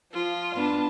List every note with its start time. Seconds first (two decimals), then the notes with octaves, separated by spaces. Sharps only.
0.13 F3 F4
0.55 B3 D4 A5